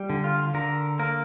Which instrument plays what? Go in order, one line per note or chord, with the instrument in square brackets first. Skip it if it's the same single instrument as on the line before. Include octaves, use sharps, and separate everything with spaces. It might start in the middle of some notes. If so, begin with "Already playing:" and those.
Already playing: [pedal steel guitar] G3
D3
F4
D3 A#4
A#3 A#4